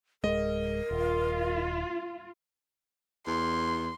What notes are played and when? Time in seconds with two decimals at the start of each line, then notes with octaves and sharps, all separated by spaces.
0.24 D1 G#3 A#4 D#5
0.91 D#1 F4
3.27 E2 C6